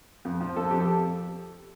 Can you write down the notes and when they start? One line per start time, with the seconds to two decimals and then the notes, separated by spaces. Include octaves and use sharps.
0.25 F2
0.40 F3
0.56 F2 A4
0.71 F2 G4
0.80 A4